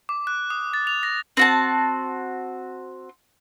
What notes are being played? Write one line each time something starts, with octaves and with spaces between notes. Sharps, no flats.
D6
F#6
D#6
A6
F7
A#6
C4 F#4 A5